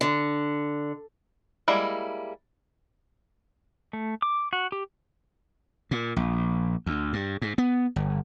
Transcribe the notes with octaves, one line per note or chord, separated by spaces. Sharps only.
D3
G3 G#3 A#3 E4
A3
D6
F#4
G4
A#2
A#1
D2
G2
G#2
B3
G1